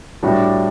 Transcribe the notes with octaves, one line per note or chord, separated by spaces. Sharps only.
A2 G3 D4 F#4